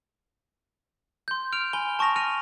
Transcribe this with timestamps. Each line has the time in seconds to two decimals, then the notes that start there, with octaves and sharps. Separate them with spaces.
1.28 C6 G6
1.53 F6 D7 F7
1.73 G#5 B5 G7
1.99 A5 C#6 D#6 A#6 F7
2.16 F6 A#6 C#7 D#7 F7